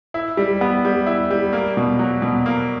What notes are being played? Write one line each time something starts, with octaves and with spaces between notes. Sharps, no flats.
E4
G3
B3
G3
E4
G3
A#3
B2
F#3
B2
A#3